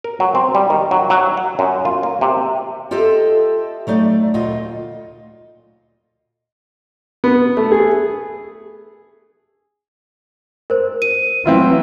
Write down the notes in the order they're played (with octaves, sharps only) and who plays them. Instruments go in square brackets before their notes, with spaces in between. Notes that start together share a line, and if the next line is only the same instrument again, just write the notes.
[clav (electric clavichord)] A#4
F#3
C4
G3
D#3
F#3
F#3
F#5
F#2
F4
A#3
C3
[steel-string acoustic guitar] F4 G4 A4 D#5 E5
F#3 A3 D#4 D5
D2 A#2 F4 D#5
[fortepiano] B3
A3
G#4
[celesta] A#4 C5
D#7
[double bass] E3 F#3 [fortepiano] C4 E4 F4